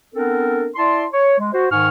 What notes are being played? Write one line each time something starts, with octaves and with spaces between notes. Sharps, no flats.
B3 C4 D4 A4 A#4
E4 D5 A5 C6
C#5
G#3
F#4 C5
G#2 D#3 G#5 C#6 F6